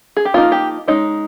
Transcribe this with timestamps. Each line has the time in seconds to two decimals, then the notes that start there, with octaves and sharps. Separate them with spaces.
0.17 G#4
0.25 G4
0.34 F3 A#3 D#4 F4
0.52 G4
0.88 G#3 C#4 D#4